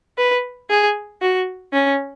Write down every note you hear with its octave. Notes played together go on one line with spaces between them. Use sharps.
B4
G#4
F#4
C#4